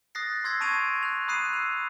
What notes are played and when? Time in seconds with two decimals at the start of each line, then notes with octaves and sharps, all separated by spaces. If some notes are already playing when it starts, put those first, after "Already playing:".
0.15 D#6 F#6 A6 A#6 C7
0.44 C6 E6 G#6 A#6 C7
0.60 A5 C#6 D7 D#7 F7
1.03 F#6 F7
1.28 B5 D#6 F#6 C7 D#7
1.53 E6 F7